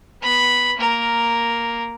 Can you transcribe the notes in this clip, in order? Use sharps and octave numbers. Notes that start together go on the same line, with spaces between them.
B3 B5
A#3 A#4